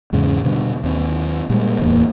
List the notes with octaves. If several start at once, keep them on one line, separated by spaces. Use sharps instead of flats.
E2 G#2 C#3
B2 D3 G3
D#2 C4
A#2 G3 G#3 A#3
D1 E2 A#3